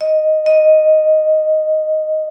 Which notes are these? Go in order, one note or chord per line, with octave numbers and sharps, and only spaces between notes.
D#5
D#5